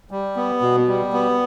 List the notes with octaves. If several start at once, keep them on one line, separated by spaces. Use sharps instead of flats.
G3
B3
B2
G3
B3